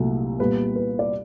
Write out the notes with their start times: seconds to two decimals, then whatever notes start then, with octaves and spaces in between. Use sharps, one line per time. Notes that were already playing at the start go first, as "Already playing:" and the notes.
Already playing: C2 A#2 F#3 A3
0.39 A#2 G3 B3 B4
0.76 B4
0.99 D5